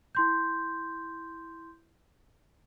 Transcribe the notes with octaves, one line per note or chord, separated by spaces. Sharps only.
E4 C6 G6